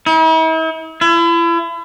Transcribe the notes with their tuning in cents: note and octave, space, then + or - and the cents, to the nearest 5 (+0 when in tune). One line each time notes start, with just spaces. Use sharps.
E4 -45
E4 +35